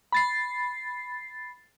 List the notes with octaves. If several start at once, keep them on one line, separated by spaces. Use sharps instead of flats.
B5 A6 C7